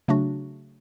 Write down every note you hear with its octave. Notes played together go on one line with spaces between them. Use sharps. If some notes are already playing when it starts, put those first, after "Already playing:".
C#3 F#3 A3 D4 F#4